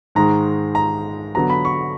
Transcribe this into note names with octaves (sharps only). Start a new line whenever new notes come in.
G#2 D#3 G#3 A#5
A#5
D3 F#3 B3 A#5
B5
C#6